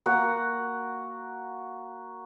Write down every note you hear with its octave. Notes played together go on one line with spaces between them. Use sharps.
A#3 F#4 F#5